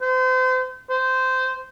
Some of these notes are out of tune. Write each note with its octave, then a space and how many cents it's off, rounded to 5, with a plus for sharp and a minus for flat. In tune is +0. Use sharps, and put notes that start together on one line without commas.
C5 -35
C5 -15